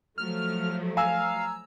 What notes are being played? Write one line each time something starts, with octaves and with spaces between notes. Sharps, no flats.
F3 F#3 A3 F6
F5 G#5 A#5 E6